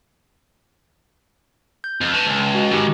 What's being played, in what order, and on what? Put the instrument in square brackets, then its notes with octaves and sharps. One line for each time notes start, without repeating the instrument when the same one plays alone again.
[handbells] G6
[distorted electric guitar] F2
B4 A5
[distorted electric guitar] C#2 [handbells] G#5 A5
[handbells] F#4 D#5
[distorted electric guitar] D#3 G#3 [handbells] D#4 G4